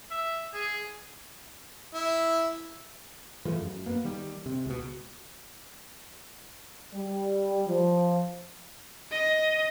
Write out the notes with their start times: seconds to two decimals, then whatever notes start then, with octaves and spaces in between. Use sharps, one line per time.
0.11 E5
0.54 G#4
1.94 E4
3.45 E3 F3 G#3 A3
3.61 F#2
3.86 A#3 B3
4.04 D#3 G3
4.46 C3
4.66 C#2 B2
6.94 G3
7.68 F3
9.11 D#5